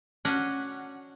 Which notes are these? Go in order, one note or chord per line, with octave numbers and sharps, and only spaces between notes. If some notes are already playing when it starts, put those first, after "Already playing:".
C#4 D4 F#4 D#5 F#5